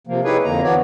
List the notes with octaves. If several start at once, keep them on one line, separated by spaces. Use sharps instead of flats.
C3 F3 A#3
D#4 E4 G4 G#4 B4 C#5
F2 D3 A#3 A#5
E3 B3 D4 F#4 C#5 D5